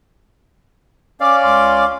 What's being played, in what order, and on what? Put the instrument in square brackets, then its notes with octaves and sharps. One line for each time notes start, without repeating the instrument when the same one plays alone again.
[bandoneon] C#4 D5 F5 [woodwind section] D6
[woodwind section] C#2 C6 D6